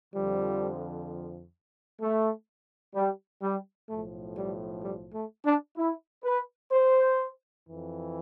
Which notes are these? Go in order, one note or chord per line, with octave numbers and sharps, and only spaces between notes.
F2 D3 F3 G3
A3
G3
G3
B1 A2 F3 A3
G3
G3
A3
D4
E4
B4
C5
F2 E3